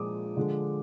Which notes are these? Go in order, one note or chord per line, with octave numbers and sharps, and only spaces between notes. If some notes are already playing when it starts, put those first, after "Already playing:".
Already playing: A#2 F3 G#3 D6 D#6
D3 F3 G#3